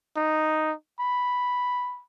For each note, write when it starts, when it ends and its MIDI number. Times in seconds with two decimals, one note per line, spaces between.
0.16 0.73 63
1.00 2.03 83